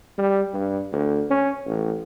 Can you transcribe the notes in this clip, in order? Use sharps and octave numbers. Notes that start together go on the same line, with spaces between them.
G3
G2
D2
C#4
A1